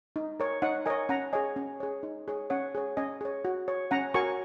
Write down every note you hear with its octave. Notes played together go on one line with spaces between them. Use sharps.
D#4
A#4 C#5
D#4 C#5 F#5
A#4 C#5 D#5 G#5
C#4 F#5 A#5
G#4 C#5 D#5 G#5
C#4
G#4 C#5
D#4
G#4 C#5
C#4 C#5 F#5
G#4 C#5
C#4 D#5 G#5
G#4 C#5
F#4
C#5
C#4 F#5 A#5
F#4 A#4 C#5 G#5 C#6